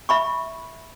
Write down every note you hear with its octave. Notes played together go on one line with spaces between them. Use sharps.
E5 B5 C#6